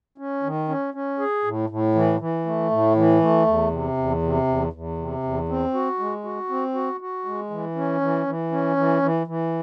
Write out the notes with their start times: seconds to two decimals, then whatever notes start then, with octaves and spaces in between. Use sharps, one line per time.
0.18 C#4
0.43 D#3
0.69 C#4
0.94 C#4
1.19 G#4
1.44 A2
1.69 A2
1.95 E3
2.20 E3
2.46 A3
2.71 A2
2.96 E3
3.21 A3
3.47 E2
3.71 C3
3.97 E2
4.22 C3
4.47 E2
4.73 E2
4.98 C3
5.23 E2
5.49 C4
5.74 F#4
5.99 G#3
6.24 F#4
6.49 C4
6.74 F#4
7.01 F#4
7.25 G#3
7.50 E3
7.75 C#4
8.01 E3
8.27 E3
8.51 C#4
8.76 E3
9.02 E3
9.27 E3